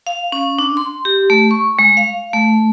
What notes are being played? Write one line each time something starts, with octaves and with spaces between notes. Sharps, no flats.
F5
C#4
D4
C6
G4
A3
C#6
G#3
F5
A3